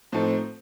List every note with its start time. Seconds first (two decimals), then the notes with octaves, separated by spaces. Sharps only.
0.12 A2 F3 C4 D#4 A4